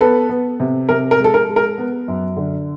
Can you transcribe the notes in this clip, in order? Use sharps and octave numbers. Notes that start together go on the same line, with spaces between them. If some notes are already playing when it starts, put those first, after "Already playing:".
B3 A4 B4
B3
C3
C3 A#4
A#4
G#3 A4
A#4
G#3
A#4
B3
F#2
D3